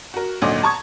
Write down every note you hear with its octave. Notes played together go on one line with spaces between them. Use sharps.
F#4 A#4
G#1 D2 A#2 F#3 D#5 D6
A5 A#5 C#6 D#6 G#6